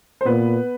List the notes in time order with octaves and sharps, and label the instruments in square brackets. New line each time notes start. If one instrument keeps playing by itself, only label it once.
[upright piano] C5
[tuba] A#2 [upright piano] B3 B4